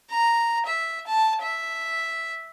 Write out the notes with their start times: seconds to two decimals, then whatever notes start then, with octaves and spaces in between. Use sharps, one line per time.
0.11 A#5
0.66 E5
1.07 A5
1.42 E5